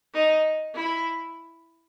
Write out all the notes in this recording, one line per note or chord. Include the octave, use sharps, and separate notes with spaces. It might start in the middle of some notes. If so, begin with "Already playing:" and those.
D#4
E4